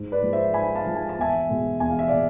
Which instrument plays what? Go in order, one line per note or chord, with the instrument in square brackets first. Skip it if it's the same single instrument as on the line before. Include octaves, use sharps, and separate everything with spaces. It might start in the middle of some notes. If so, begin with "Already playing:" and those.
Already playing: [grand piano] G#2
B4 D5
F3 G#3
C5 E5
G#2 G#5 B5
F5 A5
F3 G#3
G#5
A5
E2 E5 G#5
B2 G#3
E2 G#5
F5
E5
B2 D5 F5